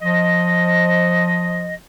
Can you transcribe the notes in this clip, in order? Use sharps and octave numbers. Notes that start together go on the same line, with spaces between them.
F3 D#5